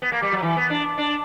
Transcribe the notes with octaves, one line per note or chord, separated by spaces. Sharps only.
B3
A#3
G3
F#3
E3
B3
D4
D4